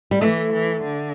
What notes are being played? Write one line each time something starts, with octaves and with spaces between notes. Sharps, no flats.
G3
E3 A3
E3
D3